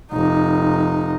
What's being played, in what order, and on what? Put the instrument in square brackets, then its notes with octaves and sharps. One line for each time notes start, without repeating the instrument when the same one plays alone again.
[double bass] F1 D#4